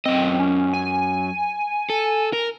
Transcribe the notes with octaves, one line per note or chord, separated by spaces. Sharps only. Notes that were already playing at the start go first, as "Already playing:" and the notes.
F#2 C4 D#5
C#4
G#5
A4
A#4